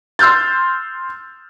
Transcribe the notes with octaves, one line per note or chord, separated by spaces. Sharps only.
C6 E6 F6 G6 A6